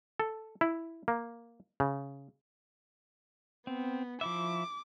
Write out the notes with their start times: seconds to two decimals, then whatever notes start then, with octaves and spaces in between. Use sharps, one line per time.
0.20 A4
0.61 E4
1.08 A#3
1.80 C#3
3.67 B3 C4
4.21 F3 E4 E5 D6